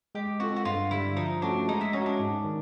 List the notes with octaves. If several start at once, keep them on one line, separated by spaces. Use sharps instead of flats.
G#3 G4
C4 F4 F#4 A4
F#4
G2 F4
D3 G3 E4
F3 D#4
A3 C#4 D4 F#4
G#3 D#4
E4
C#4 D#4 F#4
D4
G#2
D#3